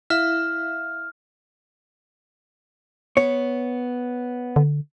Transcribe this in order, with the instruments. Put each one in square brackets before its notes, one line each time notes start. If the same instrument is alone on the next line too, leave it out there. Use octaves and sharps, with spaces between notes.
[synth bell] E4 E5 F5 [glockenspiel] F6
[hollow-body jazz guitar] B3 C#5
[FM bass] D3